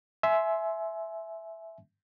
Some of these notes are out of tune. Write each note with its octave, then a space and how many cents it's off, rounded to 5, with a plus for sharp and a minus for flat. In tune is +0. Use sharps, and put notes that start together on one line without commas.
E5 +0 G#5 +30 C6 +0